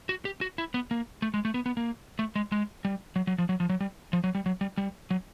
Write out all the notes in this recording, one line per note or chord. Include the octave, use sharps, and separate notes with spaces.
F#4
G4
F#4
E4
B3
A#3
A3
G#3
A3
B3
B3
A#3
A3
G#3
G#3
G3
F#3
F#3
F3
F#3
F3
F#3
G3
F3
F#3
G3
F#3
G3
G3
F#3